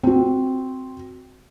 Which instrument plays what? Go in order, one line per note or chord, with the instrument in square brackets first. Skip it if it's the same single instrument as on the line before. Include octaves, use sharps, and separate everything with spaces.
[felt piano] C4 F#4